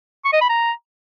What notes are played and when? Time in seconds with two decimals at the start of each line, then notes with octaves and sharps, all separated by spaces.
0.25 C#6
0.33 D#5
0.41 B5
0.49 A#5